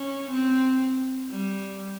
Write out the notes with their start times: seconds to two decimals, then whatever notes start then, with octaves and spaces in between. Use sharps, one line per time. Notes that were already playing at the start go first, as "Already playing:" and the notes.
Already playing: C#4
0.30 C4
1.30 G3